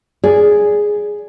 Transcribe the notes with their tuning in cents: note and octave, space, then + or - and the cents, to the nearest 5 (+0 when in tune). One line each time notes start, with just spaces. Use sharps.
G#4 +0 D5 -10